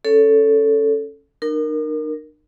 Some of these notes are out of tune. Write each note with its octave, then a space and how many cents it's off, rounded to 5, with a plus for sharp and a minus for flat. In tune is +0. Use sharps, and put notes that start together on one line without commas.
C#4 +0 A4 +0 C#5 +20
D#4 -45 A#4 +0